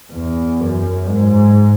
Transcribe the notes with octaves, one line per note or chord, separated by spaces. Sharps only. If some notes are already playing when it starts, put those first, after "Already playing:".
E2
F#2
G#2